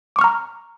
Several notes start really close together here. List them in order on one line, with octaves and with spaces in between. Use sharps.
D6 C#6 F6 A#5